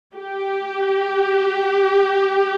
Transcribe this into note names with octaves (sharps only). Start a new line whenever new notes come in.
G4